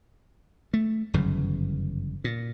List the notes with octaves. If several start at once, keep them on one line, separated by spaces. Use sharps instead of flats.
A3
G1 F#2 C#3 E3
A#2